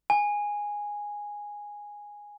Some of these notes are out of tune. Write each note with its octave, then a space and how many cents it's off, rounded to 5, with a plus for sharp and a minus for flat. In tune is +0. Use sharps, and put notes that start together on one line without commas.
G#5 -5